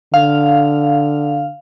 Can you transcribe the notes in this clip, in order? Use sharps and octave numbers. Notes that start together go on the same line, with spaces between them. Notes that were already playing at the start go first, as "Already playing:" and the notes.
D3 F5